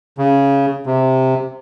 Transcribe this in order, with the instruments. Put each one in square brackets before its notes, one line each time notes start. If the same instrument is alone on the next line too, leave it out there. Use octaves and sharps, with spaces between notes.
[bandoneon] C#3
C3